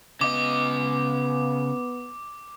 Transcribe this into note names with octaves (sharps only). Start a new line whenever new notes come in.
C#3 B3 D#5 D6